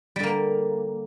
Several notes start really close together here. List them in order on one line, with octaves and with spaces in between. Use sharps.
G3 D3 A#3